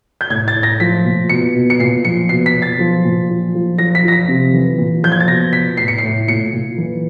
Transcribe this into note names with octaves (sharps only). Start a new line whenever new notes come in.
G6
A2 G#6
A6
A2
A#6
F3 B6
A#2
B2 C#7
B2
C#7
A#2 C7
F3 C#7
B2 C7
B6
B2
A6
F3
A#2
F3
F3
F3 A#6
B6
F3 A#6
B6
C3
E3
A#2
F3 G6
G#6
A6
B2 A#6
B2 B6
A2 C7
C#7
C7
A2
A#2 C#7
A#2
E3